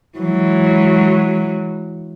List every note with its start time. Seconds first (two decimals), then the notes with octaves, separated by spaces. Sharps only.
0.19 E3 F#3 G#3